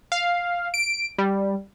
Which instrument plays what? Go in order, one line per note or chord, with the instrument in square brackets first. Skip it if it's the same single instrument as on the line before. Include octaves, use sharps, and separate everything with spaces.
[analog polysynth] F5
D7
G3